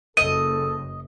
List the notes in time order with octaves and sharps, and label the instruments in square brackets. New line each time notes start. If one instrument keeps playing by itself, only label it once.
[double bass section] F#1 [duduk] A4 [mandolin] D#5 [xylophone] D#7